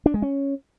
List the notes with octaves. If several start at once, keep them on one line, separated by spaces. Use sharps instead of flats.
D4
G#3
C#4